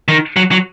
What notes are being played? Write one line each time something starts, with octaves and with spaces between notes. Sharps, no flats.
D#3
F#3
F#3